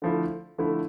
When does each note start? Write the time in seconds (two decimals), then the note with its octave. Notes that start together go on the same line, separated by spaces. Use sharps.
0.02 D3 F3 A3 E4
0.58 D3 F3 A3 E4